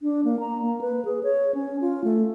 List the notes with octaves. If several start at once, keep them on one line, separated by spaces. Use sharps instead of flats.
D4
A#3
A#5
A#3
B4
G#4
C#5
C#4
F4
A3